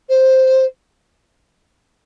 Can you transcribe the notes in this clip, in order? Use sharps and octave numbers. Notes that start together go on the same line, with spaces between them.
C5